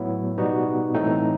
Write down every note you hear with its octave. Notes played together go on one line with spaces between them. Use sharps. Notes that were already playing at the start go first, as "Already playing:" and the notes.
Already playing: A2 F#3 B3 E4
B2 G3 B3 D#4 F#4
A2 E3 A3 C4 D#4